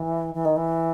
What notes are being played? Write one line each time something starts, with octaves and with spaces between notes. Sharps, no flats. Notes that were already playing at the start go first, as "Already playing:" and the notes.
Already playing: E3
E3
D#3
E3